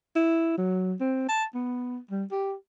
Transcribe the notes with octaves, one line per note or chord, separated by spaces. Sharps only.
E4
F#3
C4
A5
B3
G3
G4